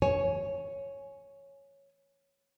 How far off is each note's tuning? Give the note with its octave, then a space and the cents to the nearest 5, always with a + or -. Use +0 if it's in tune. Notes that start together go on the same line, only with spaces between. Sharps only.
C#5 +0 G#5 +15